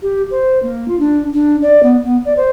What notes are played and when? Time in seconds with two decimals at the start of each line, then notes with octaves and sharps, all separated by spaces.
0.02 G4
0.30 C5
0.62 A#3
0.87 F4
0.99 D4
1.33 D4
1.61 D5
1.82 B3
2.04 B3
2.25 D5
2.36 C5